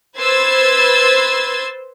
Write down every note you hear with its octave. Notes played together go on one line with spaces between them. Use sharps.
B4 C5 C6 E6 G#6 A6